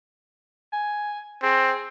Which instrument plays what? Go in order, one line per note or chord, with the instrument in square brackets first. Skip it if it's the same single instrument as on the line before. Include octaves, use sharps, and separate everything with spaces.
[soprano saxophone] G#5
[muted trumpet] C4 [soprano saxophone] G#4